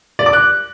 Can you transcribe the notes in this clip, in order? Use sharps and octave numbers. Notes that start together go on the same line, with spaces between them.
D5
D6
F#6